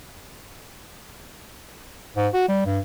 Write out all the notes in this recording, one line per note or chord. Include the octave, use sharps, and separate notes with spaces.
G#2
F#4
G3
G2